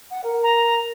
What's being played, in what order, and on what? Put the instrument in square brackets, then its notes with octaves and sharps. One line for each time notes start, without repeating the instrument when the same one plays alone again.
[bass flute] F#5
A#4
[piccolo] A#5